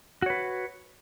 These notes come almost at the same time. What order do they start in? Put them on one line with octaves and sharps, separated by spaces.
F#4 C#5 B4